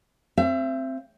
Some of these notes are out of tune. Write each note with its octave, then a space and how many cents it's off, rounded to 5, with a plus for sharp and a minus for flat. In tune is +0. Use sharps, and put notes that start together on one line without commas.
C4 +0 E5 +35